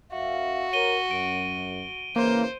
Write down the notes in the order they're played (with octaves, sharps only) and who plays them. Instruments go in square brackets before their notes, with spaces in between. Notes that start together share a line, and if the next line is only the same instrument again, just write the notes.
[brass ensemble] F#2 E5 F5 [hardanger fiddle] F#4
[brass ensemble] A#4 C#5 [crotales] D#7 G7
[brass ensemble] F#2 [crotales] D7
[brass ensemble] C#3 E3 [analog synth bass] A#3 [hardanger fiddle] C5